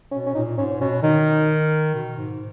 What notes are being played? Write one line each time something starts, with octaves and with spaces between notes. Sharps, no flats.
B2 C#4
C#4
A#2 D#4
G#2 C#4
B2 C#4
D#3 D#4
B2
G#2